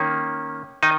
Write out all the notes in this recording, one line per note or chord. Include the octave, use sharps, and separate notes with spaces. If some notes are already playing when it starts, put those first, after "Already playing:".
Already playing: D#3 A#3 C#4
D#3 D#4